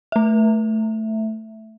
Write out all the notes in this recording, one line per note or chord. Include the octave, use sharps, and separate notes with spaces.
A3 E5